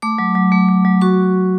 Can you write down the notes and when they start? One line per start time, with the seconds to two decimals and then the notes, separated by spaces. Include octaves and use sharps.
0.02 A3 D6
0.18 F#3
0.35 F#3
0.52 A3
0.69 A3
0.85 F#3
1.01 F#4 C#6